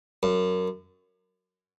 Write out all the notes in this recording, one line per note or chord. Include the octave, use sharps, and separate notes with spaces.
F#2